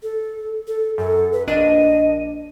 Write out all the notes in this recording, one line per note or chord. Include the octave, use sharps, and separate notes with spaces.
A4
A4
F#2 A4
B4
A#1 D4 D#5 D#7